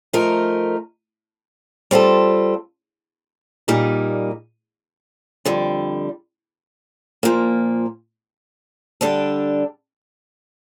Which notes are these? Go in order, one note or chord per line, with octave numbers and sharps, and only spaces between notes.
F3 A3 D#4 A#4
G3 C4 F4 A4
A#2 G3 A#3 D#4
F2 D3 G3
A#2 F3 A#3
D3 G3 D4 A4